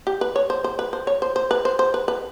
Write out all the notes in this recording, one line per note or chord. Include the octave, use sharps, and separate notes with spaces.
G4
B4
C#5
C5
C5
B4
C5
C#5
C5
C5
B4
C5
C5
B4
B4